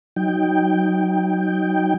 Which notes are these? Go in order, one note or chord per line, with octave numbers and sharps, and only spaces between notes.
F#3 D#4 G5